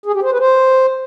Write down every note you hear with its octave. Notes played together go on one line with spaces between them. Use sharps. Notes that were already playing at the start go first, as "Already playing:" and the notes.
G#4
G4
C5
B4
C5